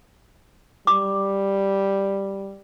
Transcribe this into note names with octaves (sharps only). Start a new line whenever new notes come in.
G3 D6